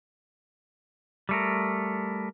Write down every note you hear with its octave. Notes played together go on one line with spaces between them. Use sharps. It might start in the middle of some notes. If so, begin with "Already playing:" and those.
G3 A3 A#4